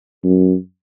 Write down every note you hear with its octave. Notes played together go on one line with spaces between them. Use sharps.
F#2